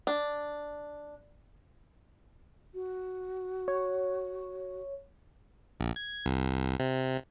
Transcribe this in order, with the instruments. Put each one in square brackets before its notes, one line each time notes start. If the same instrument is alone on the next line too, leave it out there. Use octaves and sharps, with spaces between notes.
[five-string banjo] D4
[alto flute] F#4
[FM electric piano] C#5
[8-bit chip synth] A#1
G#6
C2
C3